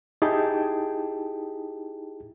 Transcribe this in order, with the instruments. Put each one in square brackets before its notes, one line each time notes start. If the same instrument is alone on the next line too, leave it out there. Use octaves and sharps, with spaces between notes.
[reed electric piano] D#4 E4 G4 G#4 G5 A5